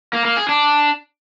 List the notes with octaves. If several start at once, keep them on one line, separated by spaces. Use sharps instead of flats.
A#3
A#3
G#4
D4